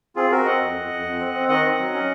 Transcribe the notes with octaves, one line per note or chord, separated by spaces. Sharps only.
C4 F4 G#4
C4 F#4 A#4
C4 D#5 F#5
F2
F2
F2
F2
C4
C4
D#3 D#5 F#5
C4
F#3
C#4